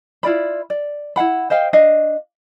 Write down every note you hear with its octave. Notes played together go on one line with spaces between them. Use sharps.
E4 F4 D5 B5
D5
E4 F5 F#5 B5
C5 D#5 F5 G5
D4 D#5 F5